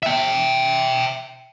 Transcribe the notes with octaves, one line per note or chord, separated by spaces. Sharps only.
E5 G5